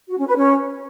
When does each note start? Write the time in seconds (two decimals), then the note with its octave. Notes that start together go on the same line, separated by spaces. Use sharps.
0.08 F#4
0.18 C#4
0.27 B4
0.36 C#4